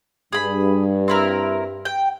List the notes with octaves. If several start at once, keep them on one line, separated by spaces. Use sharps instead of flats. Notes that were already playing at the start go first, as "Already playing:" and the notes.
G2 G#4 B5
C4 E4 A#4
G5